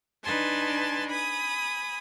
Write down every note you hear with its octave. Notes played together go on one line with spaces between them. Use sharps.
D4 D#4 B4 G#5 A5 C6
G#5 B5 D#6